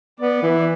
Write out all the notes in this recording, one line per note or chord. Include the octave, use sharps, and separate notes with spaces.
B3 D5
E3